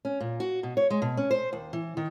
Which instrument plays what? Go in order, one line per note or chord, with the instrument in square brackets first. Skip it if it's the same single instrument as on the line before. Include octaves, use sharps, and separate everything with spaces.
[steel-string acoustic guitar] C#4
A#2
F#4
B2
C#5
G#3
B2
C#4
C5
D#2
E3
D#3